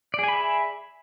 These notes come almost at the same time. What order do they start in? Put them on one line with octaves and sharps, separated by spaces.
D5 G#4 G#5 B5 E5